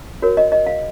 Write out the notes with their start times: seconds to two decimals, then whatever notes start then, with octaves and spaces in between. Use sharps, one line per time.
0.22 F#4 A#4 C#5
0.37 D#5
0.52 D#5
0.66 F5